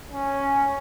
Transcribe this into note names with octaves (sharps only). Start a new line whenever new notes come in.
C#4